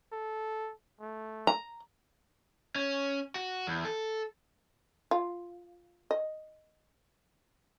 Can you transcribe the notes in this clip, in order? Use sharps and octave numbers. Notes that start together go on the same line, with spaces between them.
A4
A3
A#5
C#4
F#4
E2
A4
F4
D#5